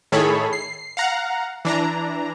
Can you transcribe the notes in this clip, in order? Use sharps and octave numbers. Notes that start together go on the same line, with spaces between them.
A2 D#3 G#4 A4 C#5 B5
C7
F5 F#5 A#5
E3 D4 A#5